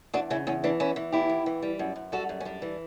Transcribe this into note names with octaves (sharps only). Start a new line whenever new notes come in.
E2 D4 F#4
C#3 C#4 E4
E2 C#4
E3 D4
E2 C#4 E4
E3
E2 E4 G4
E2
E3
G3
F#2
F#2
G3 F#4 A4
F#2
C#4
G3 D4
E3